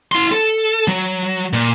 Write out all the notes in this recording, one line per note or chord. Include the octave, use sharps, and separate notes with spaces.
E4 C6
A4
F#3
A#2